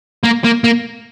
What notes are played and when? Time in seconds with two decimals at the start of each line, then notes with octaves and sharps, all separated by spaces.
0.23 A#3
0.44 A#3
0.64 A#3